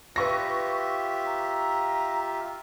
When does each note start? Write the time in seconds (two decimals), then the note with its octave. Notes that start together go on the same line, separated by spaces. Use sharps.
0.16 F4 G4 B4 E5 C#6 A#6
1.27 A#5